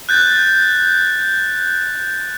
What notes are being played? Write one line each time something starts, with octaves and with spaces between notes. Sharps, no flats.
F#6 G6 A6